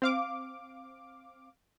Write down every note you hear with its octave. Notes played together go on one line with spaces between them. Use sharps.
C4 F5 D6